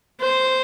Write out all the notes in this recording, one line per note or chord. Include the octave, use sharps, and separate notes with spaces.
C5